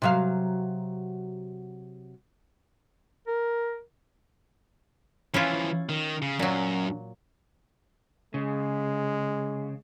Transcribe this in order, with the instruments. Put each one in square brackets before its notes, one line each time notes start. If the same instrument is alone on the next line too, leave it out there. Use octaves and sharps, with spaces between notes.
[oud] C3 F#3 F5
[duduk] A#4
[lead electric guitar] E3 F3 [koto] C#4 E4 F4
[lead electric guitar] D#3
C#3
[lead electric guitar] F#2 [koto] A#2 F#3
[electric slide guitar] C#3 [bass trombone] G#3